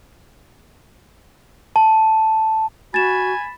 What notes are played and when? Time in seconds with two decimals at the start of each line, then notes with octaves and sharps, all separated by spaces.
1.76 A5
2.94 F#4 G#5 B5 A6 E7